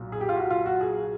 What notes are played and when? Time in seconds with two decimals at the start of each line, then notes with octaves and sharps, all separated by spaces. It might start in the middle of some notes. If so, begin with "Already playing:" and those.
Already playing: B1 A#2
0.12 G#4
0.21 G4
0.29 F4
0.36 F#4
0.50 F4
0.66 F#4
0.81 G#4